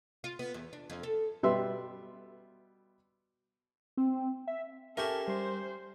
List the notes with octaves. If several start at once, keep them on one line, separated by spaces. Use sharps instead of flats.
F4
B3
E2
D4
F2
A4
B2 G3 B4 E5 C6
C4
E5
C#4 E4 G4 A4 A#4 E5
G3 C5 C6